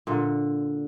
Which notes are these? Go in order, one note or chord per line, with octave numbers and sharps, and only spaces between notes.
A#2 D3